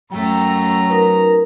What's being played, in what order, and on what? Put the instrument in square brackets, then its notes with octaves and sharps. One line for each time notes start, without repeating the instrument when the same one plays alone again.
[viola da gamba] F#2 A3 [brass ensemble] F#3 A#5 [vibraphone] G5 E6
[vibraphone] D#4 A#4 B4